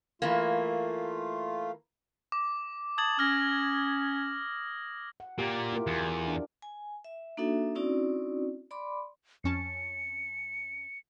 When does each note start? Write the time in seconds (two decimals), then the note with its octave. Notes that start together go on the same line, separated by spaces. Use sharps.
0.22 E3 A3 A#3 F4
2.32 D6
2.98 A5 D#6 G#6 F#7
3.19 C#4 F6 A#6
5.20 F#5
5.38 A#2 G4
5.72 E4 F4 A#4
5.87 E2
6.28 D4
6.62 G#5
7.05 E5
7.37 A#3 D4 D#4 F#4 A4 E5
7.75 C4 C#4 D#4 E4 F#4 D5
8.71 D5 B5 C6 D6
9.44 F2 C#4 A5 C#7